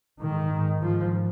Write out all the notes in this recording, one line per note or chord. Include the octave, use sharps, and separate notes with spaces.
G#2 D#3
G#2
G#2 F3